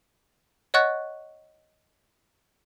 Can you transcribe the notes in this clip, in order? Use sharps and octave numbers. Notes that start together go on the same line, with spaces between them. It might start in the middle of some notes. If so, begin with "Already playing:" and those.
C#5 D#5 F#5 C#6 F#6 A6